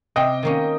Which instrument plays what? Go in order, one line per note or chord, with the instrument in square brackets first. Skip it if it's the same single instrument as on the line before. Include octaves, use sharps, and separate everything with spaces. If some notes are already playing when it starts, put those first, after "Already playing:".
[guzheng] C3 [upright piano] D#5 G5
[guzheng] D#3 A#3 C#4